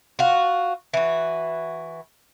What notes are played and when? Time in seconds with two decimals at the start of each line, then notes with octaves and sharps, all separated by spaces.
0.19 F4 F#4
0.94 E3 F#4